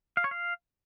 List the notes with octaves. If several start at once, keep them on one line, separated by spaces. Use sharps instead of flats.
F5
C#5
F5